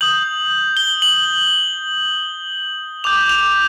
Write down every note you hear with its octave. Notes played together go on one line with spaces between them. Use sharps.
D#6 G6 F#7
G7
F#7
D6 G6 F7
F7